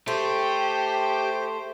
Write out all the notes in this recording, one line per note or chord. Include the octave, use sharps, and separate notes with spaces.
A3 G4 C5